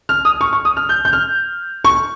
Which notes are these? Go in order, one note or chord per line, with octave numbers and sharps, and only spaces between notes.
F6
D#6
C#6
C#6
D#6
F6
G6
G6
F6
C#6